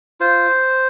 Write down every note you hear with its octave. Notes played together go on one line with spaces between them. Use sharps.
F4 C5